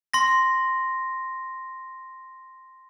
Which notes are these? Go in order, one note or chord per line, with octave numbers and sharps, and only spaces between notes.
C6 A#6